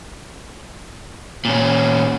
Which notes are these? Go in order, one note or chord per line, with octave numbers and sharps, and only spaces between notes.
A#2 C#4